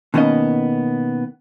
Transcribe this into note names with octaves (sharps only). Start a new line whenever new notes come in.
B2 D#3 A#3 B3 C#4 D#5